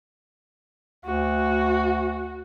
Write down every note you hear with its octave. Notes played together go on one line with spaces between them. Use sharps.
D2 F#4